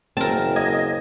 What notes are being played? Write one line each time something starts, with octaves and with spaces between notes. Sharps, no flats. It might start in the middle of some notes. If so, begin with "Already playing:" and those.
F#1 C4 A#4 A5
D#5 G#6